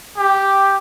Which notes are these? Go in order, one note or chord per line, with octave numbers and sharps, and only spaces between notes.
G4